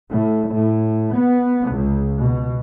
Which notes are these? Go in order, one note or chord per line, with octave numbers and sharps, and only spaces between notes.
A2
A2
B3
C#2
B2